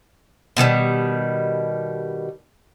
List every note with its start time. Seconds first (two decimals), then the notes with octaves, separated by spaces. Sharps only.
0.57 B2 D#3 E3 G3